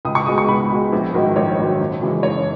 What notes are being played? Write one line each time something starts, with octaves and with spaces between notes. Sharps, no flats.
C#2 D#6
C#6
B2 G#3 D#6
C#6
C#2 B5
B2 G#3
A#1
G#2 D#3 F#3
A#1 C#5
G#2 D#3 F#3
F#1
F#2 C#3 E3 G#3
F#1 C#5